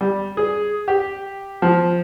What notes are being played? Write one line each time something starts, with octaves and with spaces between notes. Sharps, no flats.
G3
G#4
G4
F3